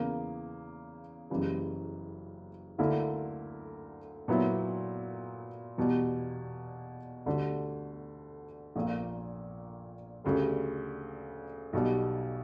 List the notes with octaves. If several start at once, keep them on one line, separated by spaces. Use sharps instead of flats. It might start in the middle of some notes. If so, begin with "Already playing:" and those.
Already playing: E2 C#3 E3 A#3
F#1 F#2 C#3 E3 G3
D2 D3 A#3 E4 A#4
A#2 F#3 B3 E4
E2 B2 G3
D2 D3 G3
A#1 A#2 A#3
D2 C#3 G3
B1 B2 G3